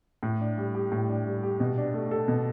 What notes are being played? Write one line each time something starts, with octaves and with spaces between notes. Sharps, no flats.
A2
D4
G3
G4
A2
D4
G3
G4
B2
D4
A3
A4
B2